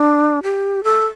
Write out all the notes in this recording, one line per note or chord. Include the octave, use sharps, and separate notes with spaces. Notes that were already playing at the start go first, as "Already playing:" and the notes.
Already playing: D4
G4
A4